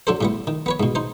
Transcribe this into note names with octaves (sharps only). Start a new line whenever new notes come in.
F#3 D4 A4 C5
A2 G3 B3
D#3
B3 B4 C#5
G#2 B2
D#4 C5